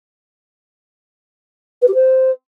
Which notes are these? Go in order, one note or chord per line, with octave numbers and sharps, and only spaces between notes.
B4
G4
C5